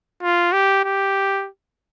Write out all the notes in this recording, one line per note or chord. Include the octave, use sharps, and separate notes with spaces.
F4
G4
G4